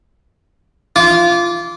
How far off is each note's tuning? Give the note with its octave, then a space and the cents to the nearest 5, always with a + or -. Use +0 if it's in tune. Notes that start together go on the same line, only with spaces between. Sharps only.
F4 -15 D6 -20